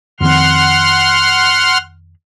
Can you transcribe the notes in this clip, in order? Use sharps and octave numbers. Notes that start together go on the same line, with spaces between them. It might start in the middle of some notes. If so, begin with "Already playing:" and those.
F2 D#3 C4 F#5 C6 F6